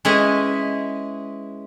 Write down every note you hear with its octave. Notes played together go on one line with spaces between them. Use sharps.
G#3 C#4 E4 B4 D#5